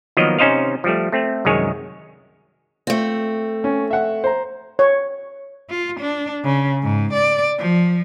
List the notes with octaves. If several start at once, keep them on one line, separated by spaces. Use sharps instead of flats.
D#3 F3 F#3 A#3 B3 D#5
C3 C#4 D#4 C5 D#5 F5
F3 G3 A3
A3 C4
C2 F#2 D#3 G#3 C#5 G#5
A3 C4 F4
C#4
E5 F#5
C5 A#5
C#5
F4
D4
C#3
G#2
D5
F3